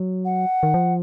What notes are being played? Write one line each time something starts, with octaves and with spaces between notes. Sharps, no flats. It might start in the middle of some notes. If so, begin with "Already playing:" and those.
Already playing: F#3
F#5
D#3
F3